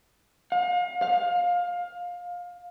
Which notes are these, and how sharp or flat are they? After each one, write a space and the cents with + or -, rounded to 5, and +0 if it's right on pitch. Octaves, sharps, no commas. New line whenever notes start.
F5 +40
F5 +20